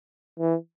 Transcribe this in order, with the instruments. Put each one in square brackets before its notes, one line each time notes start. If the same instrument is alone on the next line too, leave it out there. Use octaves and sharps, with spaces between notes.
[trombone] E3